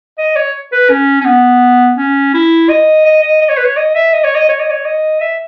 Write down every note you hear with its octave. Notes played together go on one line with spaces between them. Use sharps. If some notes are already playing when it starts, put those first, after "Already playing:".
D#5
C#5
B4
C#4
C#4
B3
C#4
E4
D#5
D#5
D#5
D#5
C#5
B4
C#5
D#5
E5
D#5
C#5
D#5
C#5
D#5
C#5
D#5
E5